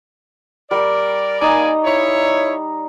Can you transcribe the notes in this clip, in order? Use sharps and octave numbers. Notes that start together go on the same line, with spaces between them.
G3 A#4 D5
A#3 D#4 D5 G#5
E4 C#5